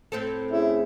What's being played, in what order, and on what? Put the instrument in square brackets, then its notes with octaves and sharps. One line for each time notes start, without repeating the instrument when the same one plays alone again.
[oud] A2 C4 A4
[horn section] C#4 E4 [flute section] G#4 E5